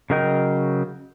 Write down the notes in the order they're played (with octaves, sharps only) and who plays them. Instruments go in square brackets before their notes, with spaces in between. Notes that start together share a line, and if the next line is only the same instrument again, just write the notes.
[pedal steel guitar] C#3 F#3 A#4 D#5 G5